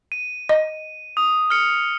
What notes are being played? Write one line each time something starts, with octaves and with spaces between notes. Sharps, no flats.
D#7
D#5
D#6
F6 C#7